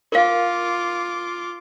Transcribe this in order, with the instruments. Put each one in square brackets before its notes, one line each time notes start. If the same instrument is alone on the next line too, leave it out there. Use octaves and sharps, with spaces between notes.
[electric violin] F4 D6 [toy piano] A#4 F5